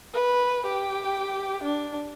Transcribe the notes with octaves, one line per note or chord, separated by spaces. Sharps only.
B4
G4 G5
D4